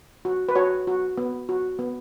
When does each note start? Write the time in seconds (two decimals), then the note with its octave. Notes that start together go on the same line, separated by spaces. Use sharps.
0.25 F#4
0.49 B4
0.55 F#4 C#5
0.87 F#4
1.18 B3
1.49 F#4
1.79 B3